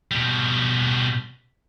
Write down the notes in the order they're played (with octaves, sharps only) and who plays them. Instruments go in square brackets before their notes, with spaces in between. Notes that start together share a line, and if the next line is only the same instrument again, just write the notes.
[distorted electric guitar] B2 G3